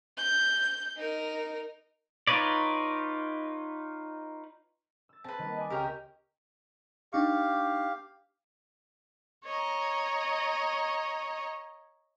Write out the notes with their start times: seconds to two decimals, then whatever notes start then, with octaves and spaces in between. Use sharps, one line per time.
0.17 G6
0.97 D#4 A#4
2.27 D#4 F4 B4 C#5 D5
5.09 E6 A6
5.24 C4 B4 A5
5.39 D#3 G3 A#3
5.56 D#5 G#5 D6
5.70 C#2 C#4 G4 A#4
7.13 D4 D#4 G4 F5 C#6
9.44 C#5 D#5 A#5